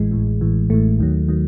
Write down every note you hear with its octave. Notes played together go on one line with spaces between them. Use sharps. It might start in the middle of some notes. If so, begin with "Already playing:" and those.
Already playing: A1 A2 E3 G#3
A1 A2 E3
A1 A2 E3
A1 A2 E3 A3
D#2 D#3 F#3
D#3 F#3